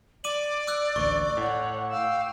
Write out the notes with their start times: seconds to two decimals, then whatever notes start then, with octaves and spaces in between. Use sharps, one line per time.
0.24 D5 D6 D#7 F#7
0.67 D6 E6 F#6
0.96 A1 D2 C#6
1.37 A2 C#5 F#5
1.91 F5 G5 E6